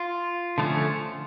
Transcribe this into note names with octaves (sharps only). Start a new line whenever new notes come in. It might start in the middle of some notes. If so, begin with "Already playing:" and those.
Already playing: F4
D3 F3 A3 C#4